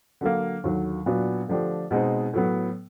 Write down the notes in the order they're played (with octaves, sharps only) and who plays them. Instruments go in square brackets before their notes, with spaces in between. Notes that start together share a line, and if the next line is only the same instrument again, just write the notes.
[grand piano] D3 F#3 A#3
D#2 D3 F#3
A#2 F#3 B3 D4 F#4
D3 F3 A3 D4 G4
B2 G#3 C4 D#4
A2 F#3 B3